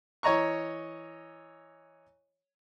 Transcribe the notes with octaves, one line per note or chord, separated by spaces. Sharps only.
E3 C#5 D#5 A#5 C#6